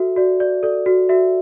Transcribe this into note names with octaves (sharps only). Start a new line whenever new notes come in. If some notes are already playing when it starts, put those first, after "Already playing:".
Already playing: F#4 A4 E5
F#4 D5
D5
A4 D5
F#4
F#4 E5